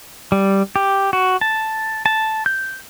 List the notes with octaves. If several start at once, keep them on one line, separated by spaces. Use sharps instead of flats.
G3
G4
F#4
A5
A5
G6